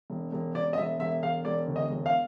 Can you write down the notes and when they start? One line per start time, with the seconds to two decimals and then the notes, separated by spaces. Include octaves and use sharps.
0.10 E1
0.32 E1
0.55 E1 D5
0.73 D#5
0.78 E1 E5
0.99 E1 E5
1.23 E1 F5
1.45 E1 D5
1.67 D2
1.76 D#5
1.90 E1
2.06 F5